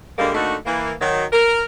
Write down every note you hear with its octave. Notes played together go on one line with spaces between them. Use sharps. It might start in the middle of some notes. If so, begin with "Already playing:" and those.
D3 G3 G#3 A#3
D3 A3 A#3 D#4 F#4 A4
E3 A#3
D#3 F#3
A#4